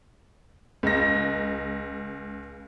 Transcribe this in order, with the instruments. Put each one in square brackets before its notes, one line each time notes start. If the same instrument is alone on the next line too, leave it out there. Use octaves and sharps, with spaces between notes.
[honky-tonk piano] C#2 A#6